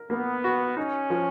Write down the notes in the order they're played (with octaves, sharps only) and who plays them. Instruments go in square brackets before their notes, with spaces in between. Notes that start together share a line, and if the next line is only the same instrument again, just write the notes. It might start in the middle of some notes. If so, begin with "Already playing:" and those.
Already playing: [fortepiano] A#4
[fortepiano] A#3 [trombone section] B3
[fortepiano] F#4
[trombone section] C#4 [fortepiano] D#4
[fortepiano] F3